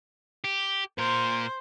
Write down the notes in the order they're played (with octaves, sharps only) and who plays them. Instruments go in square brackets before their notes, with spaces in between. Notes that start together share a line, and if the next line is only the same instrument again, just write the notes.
[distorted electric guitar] G4
[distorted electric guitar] A#2 A#4 [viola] C5